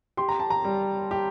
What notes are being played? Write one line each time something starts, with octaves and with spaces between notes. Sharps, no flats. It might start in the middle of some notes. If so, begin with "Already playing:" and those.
G4 C6
A#5
A5
A#5
G3
G4